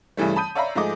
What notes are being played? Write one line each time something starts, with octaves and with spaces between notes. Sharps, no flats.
G2 C#3 E3 G3 A3
A5 B5 D#6 G6 D#7
C#5 D5 E5 F5 A#5 B5
G#2 F3 A3 G#4 D#5 D6